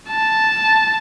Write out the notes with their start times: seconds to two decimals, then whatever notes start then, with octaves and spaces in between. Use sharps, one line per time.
0.11 A5